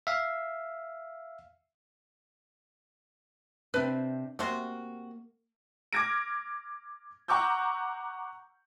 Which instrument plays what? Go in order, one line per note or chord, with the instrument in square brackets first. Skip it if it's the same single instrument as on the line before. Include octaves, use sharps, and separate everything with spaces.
[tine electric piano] E5 F5
[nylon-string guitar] C3 C4 D4 [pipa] B4
[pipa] C3 F#4 C6 [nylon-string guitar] A#3
[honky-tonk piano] D6 F6 G#6 A#6 D7
F#5 A#5 C#6 D6 E6 G6